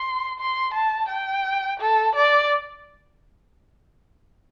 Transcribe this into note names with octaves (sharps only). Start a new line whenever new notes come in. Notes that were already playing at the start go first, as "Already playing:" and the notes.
Already playing: C6
C6
A5
G5
A4
D5